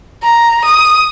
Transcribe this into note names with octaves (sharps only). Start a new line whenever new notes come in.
A#5
D#6